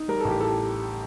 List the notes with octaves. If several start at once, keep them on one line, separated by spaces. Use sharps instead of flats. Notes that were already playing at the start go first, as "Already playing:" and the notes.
Already playing: D#4
G3 A#4
A1 A4
G4
A2 A4